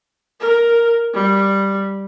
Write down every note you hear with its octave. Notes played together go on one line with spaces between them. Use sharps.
A#4
G3